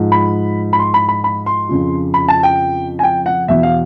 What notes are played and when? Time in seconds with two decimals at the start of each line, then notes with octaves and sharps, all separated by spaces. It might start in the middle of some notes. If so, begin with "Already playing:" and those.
Already playing: G#2 F3
0.12 B5
0.73 B5
0.79 C6
0.94 B5
1.09 B5
1.24 B5
1.46 C6
1.69 F2 C#3 F3
2.14 B5
2.28 A5
2.43 G5
2.99 G#5
3.03 G5
3.26 F#5
3.48 E2 B2 E5
3.63 F5